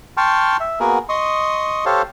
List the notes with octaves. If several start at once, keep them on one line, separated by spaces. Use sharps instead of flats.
G5 A5 C6 C#6 F6
E5
A#3 B3 F#4 G#4 A#4
D#5 C6 C#6 D#6
G4 A4 C5 C#5 F5 A5